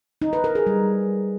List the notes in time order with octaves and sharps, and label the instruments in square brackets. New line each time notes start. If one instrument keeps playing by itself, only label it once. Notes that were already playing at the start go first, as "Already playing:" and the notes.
[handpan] D#4
B4
A#4
G#4
G3